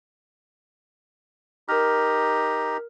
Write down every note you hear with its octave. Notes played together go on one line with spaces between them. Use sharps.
D#4 G4 A#4 A#5 F6